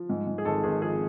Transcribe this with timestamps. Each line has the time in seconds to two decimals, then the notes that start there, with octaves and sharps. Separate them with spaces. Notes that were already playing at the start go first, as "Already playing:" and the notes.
Already playing: F3
0.09 G#2
0.27 G#2
0.38 G#4
0.45 G#1 A4
0.63 G#1 G#4
0.82 F3 G#4